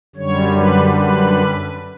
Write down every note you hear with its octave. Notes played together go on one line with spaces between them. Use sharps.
F#2 D3 G3 C#5
B4
B4